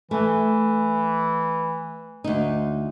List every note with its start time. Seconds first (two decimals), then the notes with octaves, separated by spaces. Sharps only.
0.11 E3 A3
2.24 D2 D#4